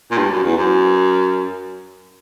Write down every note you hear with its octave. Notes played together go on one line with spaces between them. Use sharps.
A#2
G2
F#2
E2
F#2